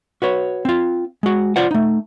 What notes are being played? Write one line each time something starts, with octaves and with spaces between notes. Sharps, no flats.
F#4 B4 C#5
C4 F4
G#3 F#4
F4 C5 D5 F5 F#5
A3 D#4